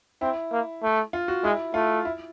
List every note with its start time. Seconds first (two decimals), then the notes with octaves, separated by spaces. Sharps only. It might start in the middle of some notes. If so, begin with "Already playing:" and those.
0.21 C4 E4
0.52 A#3
0.83 A3
1.13 F4
1.28 F#4
1.44 G#3 E4
1.74 A3 F4
2.05 E4